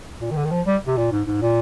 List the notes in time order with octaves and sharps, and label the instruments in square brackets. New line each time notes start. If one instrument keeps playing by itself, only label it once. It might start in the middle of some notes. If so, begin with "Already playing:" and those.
[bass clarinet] A#2
D#3
D3
D#3
F3
G3
C3
A#2
G#2
G#2
A#2